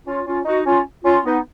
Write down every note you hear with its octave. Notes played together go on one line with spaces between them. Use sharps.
C#4 F4
C#4 F4
D#4 F#4
C#4 F4
C#4 F4
B3 D#4